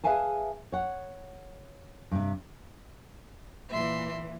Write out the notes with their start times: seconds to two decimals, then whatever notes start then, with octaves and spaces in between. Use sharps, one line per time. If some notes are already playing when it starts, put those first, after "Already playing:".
0.04 G#4 B4 E5 F5 G#5 A5
0.72 C#5 F#5
2.11 G2 C3
3.68 A#2 E3 E5 C6